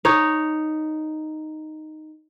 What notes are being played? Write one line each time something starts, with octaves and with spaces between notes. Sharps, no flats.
D#4 C#5